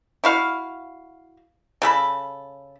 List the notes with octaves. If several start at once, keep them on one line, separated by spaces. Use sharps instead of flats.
E4 F#4 F5
C#3 A4 B5